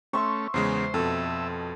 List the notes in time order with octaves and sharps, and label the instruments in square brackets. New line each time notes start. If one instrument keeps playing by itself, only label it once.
[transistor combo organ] A3 C#4 [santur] E5 C6 C#6
[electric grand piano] E2 C#3 G#3 [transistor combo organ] C5
[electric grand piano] F2 B2 [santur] A4 [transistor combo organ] E5